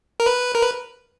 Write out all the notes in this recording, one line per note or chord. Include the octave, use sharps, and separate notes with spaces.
A#4
B4
A#4
B4